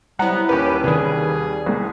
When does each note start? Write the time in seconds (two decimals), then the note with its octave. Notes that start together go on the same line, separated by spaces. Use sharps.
0.19 C3 F#3 G3 B3 E4 F#5 A#5
0.49 D#2 C#4 G4 B4
0.84 C3 D#3 G3 G#4
1.66 C2 G#3